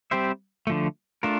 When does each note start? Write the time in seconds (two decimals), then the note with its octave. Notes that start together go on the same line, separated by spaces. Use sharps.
0.11 G3 C4 G4 C5 E5
0.67 D3 F3 A3
1.23 A3 D4 F4 A#4